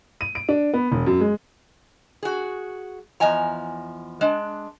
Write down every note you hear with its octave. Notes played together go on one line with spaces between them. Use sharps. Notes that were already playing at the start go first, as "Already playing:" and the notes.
D#7
D7
D4
B3
E1
F#2
G#3
F#4 G#4
E2 F3 D#5 G#5 A#5
G#3 D4